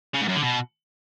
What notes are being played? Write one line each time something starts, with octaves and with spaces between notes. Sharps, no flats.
C#3
G#2
F#2
D3
B2